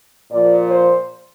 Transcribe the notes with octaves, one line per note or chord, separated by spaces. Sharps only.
A#2 F3 D5
C5